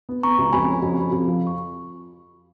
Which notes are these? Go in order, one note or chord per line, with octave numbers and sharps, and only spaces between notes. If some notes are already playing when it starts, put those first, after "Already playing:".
B3
B3 A#5 C#6
C#2
F2 G#5 B5
C#4
F2
F2
F2
F3
C#6